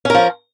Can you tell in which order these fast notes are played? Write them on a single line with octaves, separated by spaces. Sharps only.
C#4 A#4 F3